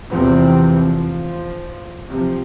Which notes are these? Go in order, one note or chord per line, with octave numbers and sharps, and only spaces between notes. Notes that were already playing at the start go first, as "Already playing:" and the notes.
A1 E2 C3 E3 F3 C4
F3
C3 F3